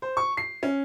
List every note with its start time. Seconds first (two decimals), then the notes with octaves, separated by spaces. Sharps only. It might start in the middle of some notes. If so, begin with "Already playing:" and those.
0.02 C5
0.17 C#6
0.37 C7
0.63 C#4